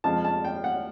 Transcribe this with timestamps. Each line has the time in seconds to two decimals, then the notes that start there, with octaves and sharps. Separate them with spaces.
0.04 F2 C#3 F3 G#3 A5
0.25 A5
0.45 G5
0.64 F#5